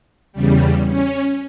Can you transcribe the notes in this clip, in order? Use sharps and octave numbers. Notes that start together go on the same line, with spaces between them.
E2 C#3 G3
C#4